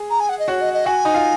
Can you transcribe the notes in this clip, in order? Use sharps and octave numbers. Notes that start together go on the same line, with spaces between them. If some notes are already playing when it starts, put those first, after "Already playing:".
Already playing: G#4
A#5
G#5
F#5
D#5
F#4 C#5 F#5
D#5
D#5
F#4 F#5 G#5
D#4 D#5
F4 F5